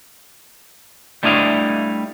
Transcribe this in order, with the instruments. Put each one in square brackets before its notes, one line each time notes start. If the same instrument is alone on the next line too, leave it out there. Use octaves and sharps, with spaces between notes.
[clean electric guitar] G3 A3 D4 E4 D#5 F5